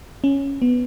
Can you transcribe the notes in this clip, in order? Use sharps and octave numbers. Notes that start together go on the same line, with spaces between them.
C#4
B3